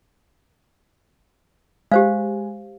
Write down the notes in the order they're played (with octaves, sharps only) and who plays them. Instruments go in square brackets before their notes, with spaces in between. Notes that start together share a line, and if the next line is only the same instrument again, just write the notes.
[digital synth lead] G#3 [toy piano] G4 C5 F5